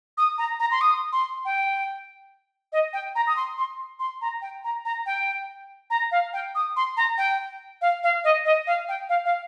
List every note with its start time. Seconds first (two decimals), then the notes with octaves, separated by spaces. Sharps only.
0.18 D#6
0.38 A#5
0.60 A#5
0.71 C6
0.81 D#6
1.12 C6
1.45 G5
2.72 D#5
2.93 G5
3.15 A#5
3.27 D#6
3.37 C6
3.58 C6
4.00 C6
4.22 A#5
4.42 G5
4.64 A#5
4.85 A#5
5.06 G5
5.90 A#5
6.12 F5
6.33 G5
6.55 D#6
6.76 C6
6.97 A#5
7.18 G5
7.81 F5
8.03 F5
8.24 D#5
8.45 D#5
8.67 F5
8.89 G5
9.09 F5
9.25 F5